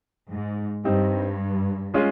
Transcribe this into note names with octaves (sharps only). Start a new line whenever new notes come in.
G#2
G2 G3 C4 D#4
G#3 C#4 F4 G#4